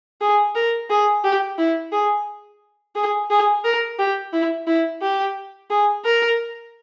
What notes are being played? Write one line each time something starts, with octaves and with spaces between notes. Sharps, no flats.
G#4
A#4
G#4
G4
E4
G#4
G#4
G#4
A#4
G4
E4
E4
G4
G#4
A#4